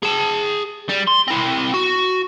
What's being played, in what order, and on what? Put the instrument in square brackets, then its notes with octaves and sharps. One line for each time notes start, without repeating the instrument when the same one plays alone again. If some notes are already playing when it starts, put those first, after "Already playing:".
[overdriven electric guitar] G#4 A5
G3
C6
C4 E4
F#4